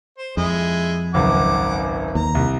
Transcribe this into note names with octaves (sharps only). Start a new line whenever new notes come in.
C5
F2 G#3 E4
G#1 C#2 F#2 F#5 D6
D#2 A#5
C2